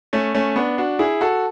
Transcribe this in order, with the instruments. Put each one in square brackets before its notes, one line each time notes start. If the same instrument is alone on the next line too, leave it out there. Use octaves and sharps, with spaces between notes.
[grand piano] A3 C#4
A3 C#4
B3 D4
D4 F#4
E4 G#4
F#4 A4